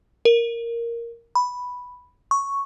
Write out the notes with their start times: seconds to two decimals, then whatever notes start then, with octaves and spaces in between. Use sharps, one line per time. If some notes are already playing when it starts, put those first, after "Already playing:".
0.25 A#4
1.35 B5
2.31 C#6